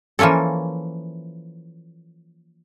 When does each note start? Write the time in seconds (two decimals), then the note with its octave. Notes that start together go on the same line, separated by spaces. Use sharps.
0.19 E3 F3 A#3 C#4 A4